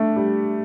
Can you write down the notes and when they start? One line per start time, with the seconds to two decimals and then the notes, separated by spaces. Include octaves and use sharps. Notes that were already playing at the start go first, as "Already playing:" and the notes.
Already playing: A3 D4
0.16 G3